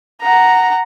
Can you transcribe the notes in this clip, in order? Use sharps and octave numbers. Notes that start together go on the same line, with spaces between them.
F#5 A#5